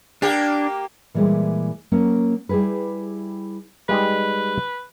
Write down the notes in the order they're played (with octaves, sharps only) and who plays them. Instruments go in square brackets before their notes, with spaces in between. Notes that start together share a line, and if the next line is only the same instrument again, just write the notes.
[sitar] A#3 G4 [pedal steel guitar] D4
[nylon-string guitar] A#2 E3 G3 G#3
F#3 A#3 C#4
G3 E4 G4 G#4 B4
[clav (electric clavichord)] G3 G#3 D#4 [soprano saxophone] B4